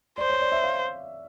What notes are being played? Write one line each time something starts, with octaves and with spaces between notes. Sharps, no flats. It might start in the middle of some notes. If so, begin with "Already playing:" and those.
C5 D5
C#5
D5
E5
F5